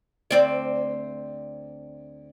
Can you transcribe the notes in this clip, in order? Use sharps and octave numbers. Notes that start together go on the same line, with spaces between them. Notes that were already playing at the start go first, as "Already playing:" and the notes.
D2 C4 D5